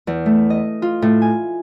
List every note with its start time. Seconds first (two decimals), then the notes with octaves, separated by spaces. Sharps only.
0.07 E2
0.26 A3
0.50 D#5
0.82 F4
1.02 A2
1.22 G#5